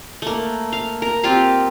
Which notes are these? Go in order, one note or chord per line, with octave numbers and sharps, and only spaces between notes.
A3 A#3
F5
A#4
C4 F4 G4 F5